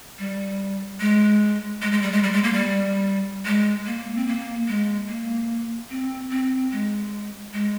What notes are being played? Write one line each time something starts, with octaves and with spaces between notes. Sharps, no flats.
G3
G#3
G#3
G#3
G3
G#3
G3
G#3
A#3
G3
G#3
A#3
C4
A#3
G#3
A#3
C4
C4
G#3
G#3